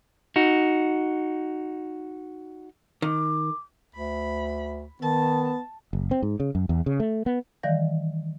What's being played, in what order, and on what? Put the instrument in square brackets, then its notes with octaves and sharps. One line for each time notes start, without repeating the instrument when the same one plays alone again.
[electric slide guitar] D#4 F#4
[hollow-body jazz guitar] D#3 [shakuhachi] D6
[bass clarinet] D2 [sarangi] B5
[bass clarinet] D#3 [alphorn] B3 [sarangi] A5
[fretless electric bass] F#1
C4
G#2
C#3
F#2
E2
C#3
A3
B3
[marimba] D#3 E3 G3 D5 F5 A#6